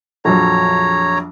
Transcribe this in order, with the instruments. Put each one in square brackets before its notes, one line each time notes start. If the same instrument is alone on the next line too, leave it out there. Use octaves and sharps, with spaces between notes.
[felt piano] A#1 F2 F#3 [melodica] C#5 A#5